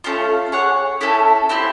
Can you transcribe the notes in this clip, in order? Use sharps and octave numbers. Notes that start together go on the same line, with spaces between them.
A3 C#4 F4
G#4 C#5 F#5
A3 C#4 E4 A4
C4 E4 G4